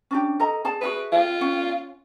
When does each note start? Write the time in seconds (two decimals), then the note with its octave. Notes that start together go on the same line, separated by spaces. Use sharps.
0.11 C#4 D4 G4
0.40 A4 D#5 A#5
0.65 G#4 D5 A5
0.81 F#4 G#4 B4 E5
1.12 F4
1.41 C#4 F#5